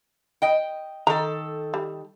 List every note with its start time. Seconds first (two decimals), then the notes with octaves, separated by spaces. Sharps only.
0.42 D#5 G5
1.07 D#3 A4 A#5
1.74 G3